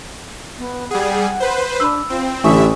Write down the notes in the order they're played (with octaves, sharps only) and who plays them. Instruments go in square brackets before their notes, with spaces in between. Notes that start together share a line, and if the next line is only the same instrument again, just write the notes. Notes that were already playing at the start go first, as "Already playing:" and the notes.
[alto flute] B3
[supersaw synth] G3 G#4 [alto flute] F#5
[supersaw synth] B4 C5
[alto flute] D4 [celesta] B5 E6
[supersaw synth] C4 [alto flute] F4
[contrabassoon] A1 [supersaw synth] D3 E5 [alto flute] G4 [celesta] G#5 C#6 D#6